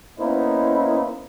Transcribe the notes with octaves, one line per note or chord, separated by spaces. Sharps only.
A#3 B3 C#4 D#4 E4 C5